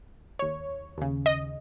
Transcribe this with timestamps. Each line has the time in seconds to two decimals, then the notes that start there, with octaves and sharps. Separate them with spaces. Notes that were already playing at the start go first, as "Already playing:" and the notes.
0.39 D#2 C#5
0.98 D#2 C#3
1.26 D#5